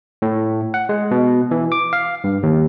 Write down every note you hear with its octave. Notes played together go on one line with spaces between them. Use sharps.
A2
F#5
G#3
B2
E3
D6
F5
G2
D#2